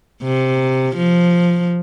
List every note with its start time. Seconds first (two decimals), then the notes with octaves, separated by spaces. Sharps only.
0.23 C3
0.96 F3